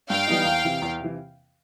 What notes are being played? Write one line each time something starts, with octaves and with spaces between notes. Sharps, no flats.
G2 F5 G5
E3 G3 B3 D#4
E2
C3 E3
E2
C3 E3